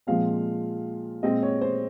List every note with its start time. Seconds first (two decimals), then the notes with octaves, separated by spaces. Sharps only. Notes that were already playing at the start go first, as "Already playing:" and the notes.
0.07 A#2 F3 G#3 C4 F5
1.23 A#2 G#3 C4 D#5
1.43 C#5
1.61 C5